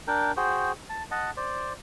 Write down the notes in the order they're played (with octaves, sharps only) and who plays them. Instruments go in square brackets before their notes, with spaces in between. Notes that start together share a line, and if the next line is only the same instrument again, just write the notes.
[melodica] D4 A#4 G5
F#4 G#4 C5 G5
A5
D#5 F#5 A5
C5 D5